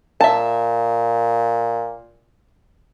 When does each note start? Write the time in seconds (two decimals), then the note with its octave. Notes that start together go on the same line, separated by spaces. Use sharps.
0.21 A#2 E5 A5